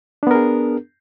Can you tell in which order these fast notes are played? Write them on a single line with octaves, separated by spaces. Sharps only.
D4 B3 A#4 G#4